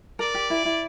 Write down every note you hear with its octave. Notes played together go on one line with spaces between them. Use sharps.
A#4 D5
G4
E4
E4